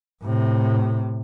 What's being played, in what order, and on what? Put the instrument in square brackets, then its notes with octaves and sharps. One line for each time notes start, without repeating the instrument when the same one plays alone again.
[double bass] A2 C3